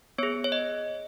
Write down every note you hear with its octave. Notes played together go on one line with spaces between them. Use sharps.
B3 G#4 C#5
C#5
D#5